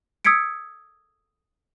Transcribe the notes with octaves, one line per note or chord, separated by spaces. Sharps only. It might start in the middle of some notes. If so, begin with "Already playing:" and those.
D#6 E6 G#6 B6 C#7 D7